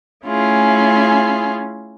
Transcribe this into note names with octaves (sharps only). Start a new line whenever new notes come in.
A3 C#4 E4 F4 G#4